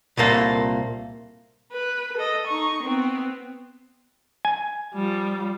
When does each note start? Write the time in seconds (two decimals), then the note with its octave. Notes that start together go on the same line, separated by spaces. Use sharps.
0.17 C2 A#2 A#3 A4
1.72 B4
2.18 A4 D#5
2.47 D#4 C#6
2.83 B3 C4
4.45 G#5
4.94 F3 G3